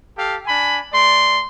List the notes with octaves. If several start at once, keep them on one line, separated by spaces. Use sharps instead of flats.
G4 A4 F5
D4 G#5 B5
A3 D5 C6